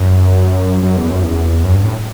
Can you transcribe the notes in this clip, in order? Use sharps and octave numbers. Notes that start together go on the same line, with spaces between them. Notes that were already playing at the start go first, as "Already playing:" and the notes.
Already playing: F#2
F#2
E2
F#2
E2
F#2
G2
A2